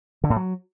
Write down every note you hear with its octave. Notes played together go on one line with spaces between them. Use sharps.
D3
A2
F#3